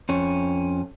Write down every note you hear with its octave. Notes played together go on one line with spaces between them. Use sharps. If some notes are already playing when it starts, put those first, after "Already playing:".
F2 C#4